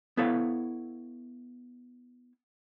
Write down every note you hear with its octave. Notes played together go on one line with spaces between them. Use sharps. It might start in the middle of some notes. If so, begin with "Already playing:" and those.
B3 E4 A4 C#5 F5